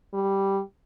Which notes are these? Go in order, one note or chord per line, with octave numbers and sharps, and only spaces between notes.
G3